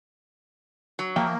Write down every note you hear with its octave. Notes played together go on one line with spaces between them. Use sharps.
F#3
F3 A#3 E5 G5